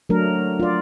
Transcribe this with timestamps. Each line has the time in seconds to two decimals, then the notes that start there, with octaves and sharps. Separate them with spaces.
0.09 F#3 A3 D4 A#4
0.60 F4 D5